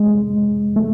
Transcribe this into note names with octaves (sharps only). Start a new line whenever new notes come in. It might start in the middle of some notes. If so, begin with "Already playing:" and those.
Already playing: G#3
A3